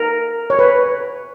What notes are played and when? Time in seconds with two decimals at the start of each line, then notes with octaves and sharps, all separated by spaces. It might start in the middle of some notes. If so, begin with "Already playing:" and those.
Already playing: A#4
0.50 C#5
0.59 B4